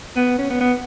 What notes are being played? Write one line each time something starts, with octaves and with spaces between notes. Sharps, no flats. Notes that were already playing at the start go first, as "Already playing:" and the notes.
B3
C#4
B3
B3